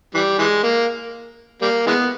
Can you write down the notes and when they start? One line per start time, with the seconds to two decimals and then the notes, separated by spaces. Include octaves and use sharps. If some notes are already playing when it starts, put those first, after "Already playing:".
0.14 E3 G3
0.39 E3 G#3
0.63 A#3
1.61 G3 A#3
1.86 E3 G#3 B3